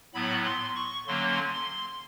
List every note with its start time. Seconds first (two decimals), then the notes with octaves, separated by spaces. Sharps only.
0.14 A2 F#3 B3 B5
0.45 C6
0.76 C#6
1.07 D3 F#3 A#3 C#4 C6
1.53 C6